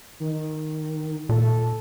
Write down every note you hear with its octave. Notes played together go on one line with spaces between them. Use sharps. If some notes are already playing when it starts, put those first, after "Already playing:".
D#3
A#2 A4